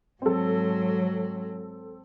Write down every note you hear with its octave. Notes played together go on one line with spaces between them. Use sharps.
G#2 F#3 C4 A4